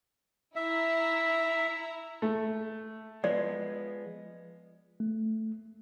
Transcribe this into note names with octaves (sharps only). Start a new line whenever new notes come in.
E4 E5 A#5
A3
F3 G#3 B3 D5
A3